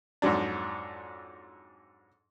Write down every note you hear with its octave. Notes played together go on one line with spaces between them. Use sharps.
F2 G#2 F#3 D4